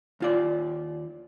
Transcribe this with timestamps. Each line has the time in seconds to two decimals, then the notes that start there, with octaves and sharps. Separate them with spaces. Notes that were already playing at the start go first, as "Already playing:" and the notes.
0.20 D#2 F4 D5